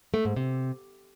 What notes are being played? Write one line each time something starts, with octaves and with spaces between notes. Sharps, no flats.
A3
G#2
C3